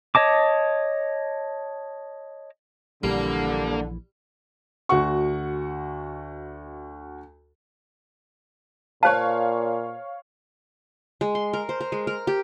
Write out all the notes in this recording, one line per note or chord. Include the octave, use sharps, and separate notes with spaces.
C#5 D#5 A5 D6
A#1 D3 E3 G3 A#3
D2 F#4 F#5 C#6
A#2 C5 C#5 F5 A5
G#3
C6
A#4
C5
A#4
G#3
A#4
G4